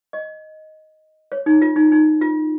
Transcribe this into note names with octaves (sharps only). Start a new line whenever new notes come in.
D#5
C#5
D#4
F4
D#4
D#4
F4